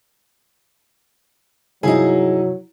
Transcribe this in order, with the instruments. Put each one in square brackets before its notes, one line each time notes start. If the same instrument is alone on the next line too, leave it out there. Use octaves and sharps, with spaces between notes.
[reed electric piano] G2 C3 F3 [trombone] F#3 [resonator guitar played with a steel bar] D#4 G#4 [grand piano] E4